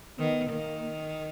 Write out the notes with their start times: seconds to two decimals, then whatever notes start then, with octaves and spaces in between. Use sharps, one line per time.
0.18 D#3 B3
0.50 D#3 A#3